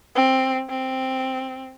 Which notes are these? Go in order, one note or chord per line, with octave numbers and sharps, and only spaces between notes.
C4
C4